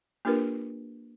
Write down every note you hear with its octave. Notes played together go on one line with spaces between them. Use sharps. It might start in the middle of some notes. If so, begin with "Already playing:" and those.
A#3 D4 F4 G4 A#4 B4